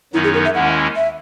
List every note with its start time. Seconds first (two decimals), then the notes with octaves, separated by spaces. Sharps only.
0.13 F#2 D#3 F#3 B3 D#4 E4
0.24 G#4
0.34 A#4
0.44 E5
0.54 D#2 D#3 G#3 C#4 E4 F#5
0.96 E5